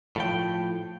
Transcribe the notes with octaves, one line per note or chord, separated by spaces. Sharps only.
A2 F3 G5